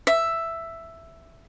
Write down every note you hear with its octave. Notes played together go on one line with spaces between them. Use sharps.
E5